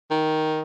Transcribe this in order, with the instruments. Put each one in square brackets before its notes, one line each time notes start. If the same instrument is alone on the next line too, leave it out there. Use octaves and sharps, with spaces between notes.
[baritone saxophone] D#3